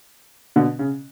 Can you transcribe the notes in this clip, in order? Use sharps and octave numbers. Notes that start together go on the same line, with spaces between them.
B2 D3
C#3